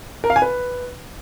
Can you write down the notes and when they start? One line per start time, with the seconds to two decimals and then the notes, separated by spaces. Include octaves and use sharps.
0.24 A#4
0.30 F5
0.36 G#5
0.42 B4